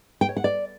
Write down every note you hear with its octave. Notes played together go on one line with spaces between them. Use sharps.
G5
C#5
F#5
D5